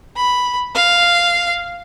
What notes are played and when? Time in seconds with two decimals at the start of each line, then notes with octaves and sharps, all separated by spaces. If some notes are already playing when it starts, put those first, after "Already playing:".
0.16 B5
0.75 F5